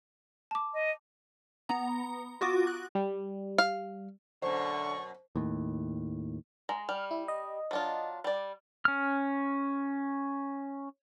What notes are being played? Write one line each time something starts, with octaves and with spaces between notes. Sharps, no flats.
A5 D6
D#5
B3 A#5
F4 F#4 D6 D#6
F#6
G3
F5
F#2 B2 D3 C5 C#6
D#2 A2
G#3 A#5
G3 F6
E4
D#5
F#3 D4 F4
G3 D5
C#4 F6